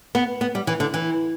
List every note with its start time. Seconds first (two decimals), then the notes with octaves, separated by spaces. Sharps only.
0.15 B3
0.41 B3
0.55 G3
0.67 E3
0.80 D3
0.94 E3